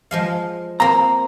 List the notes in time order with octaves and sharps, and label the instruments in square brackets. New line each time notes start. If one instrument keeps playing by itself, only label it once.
[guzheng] F3 G#3 F5
[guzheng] A#3 C4 [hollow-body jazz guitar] A#5